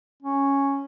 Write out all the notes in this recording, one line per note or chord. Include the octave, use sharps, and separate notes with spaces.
C#4